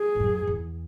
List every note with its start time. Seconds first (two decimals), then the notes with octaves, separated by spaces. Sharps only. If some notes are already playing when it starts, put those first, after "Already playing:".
Already playing: G#4
0.15 G#2
0.20 F#2
0.47 E2